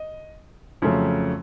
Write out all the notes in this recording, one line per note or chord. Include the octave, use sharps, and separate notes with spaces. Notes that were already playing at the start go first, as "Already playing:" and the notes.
Already playing: D#5
F2 C#3 F#3 A3 C#4